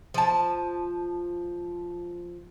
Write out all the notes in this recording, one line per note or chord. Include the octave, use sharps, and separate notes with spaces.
F3 A5